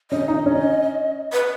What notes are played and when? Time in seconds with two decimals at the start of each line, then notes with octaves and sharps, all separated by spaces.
0.11 C#4 D#5
0.28 D#4
0.46 C#4
1.33 B4